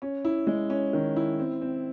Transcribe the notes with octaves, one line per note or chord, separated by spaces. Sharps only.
C#4
E4
G#3
C#4
D#3
E4
C4
C4